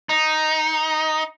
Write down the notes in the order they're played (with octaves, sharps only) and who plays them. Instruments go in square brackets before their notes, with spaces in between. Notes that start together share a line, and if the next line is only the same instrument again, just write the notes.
[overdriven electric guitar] D#4